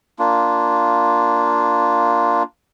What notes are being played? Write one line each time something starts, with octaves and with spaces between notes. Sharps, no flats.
A#3 D4 F4